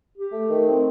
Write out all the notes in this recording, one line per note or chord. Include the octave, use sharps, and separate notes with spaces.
G4
A3
D#3
C4